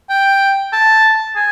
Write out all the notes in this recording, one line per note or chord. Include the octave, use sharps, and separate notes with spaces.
G5
A5
G#5